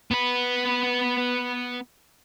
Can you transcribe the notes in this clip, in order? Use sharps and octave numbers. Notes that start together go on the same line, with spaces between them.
B3 B4